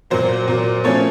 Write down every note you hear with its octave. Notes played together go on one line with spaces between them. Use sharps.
A#2 F#3 A#3 C5
A#2 F#3 A#3
F3 A3 C#4 C#5